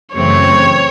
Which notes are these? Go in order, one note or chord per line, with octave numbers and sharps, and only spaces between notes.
F#2 C#3 E3 A3 C4 C#5